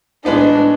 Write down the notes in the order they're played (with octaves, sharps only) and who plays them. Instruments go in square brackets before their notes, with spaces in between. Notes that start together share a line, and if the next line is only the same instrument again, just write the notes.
[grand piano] A2 E3 G#3 B3 D#4 [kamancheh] D4